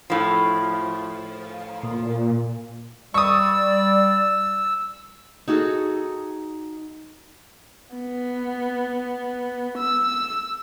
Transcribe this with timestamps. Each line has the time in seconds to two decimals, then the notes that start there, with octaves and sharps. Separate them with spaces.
0.10 A2 F3
1.83 A#2
3.14 G3 D5 C#6 D#6 E6
5.48 D#4 F#4 G#4 A4
7.96 B3
9.78 E6